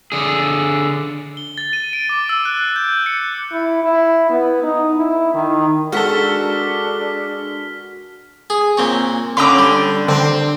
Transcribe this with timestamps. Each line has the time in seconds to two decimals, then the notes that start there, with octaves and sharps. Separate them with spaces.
0.12 D3 G#4
1.37 G7
1.58 A6
1.73 D#7
1.93 D7
2.09 D6
2.29 E6
2.45 F#6
2.58 F#6
2.76 G6
3.06 C#7
3.52 E4
3.84 E4
4.30 B3
4.63 D#4
4.97 E4
5.35 D#3
5.92 G#3 D4 F#4 A4 A#4 F6 B6 G7
8.50 G#4
8.77 A#2 C4 C#5
9.37 D3 C#4 F5 G5 A#5 B5 D6
9.59 G3 D4
10.08 D3 C4